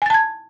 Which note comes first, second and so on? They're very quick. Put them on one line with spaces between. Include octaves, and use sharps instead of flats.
G#5 A6 A5 G#6